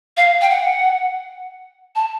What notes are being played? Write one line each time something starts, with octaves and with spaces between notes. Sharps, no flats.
F5
G5
F#5
A5